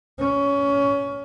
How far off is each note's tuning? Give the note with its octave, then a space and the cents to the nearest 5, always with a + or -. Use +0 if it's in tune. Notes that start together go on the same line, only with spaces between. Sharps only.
C#4 +20